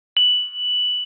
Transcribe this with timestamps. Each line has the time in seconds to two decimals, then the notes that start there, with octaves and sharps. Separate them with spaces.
0.17 F#7